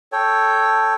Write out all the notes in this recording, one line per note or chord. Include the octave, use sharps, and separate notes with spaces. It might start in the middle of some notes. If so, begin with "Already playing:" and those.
A4 C#5 G5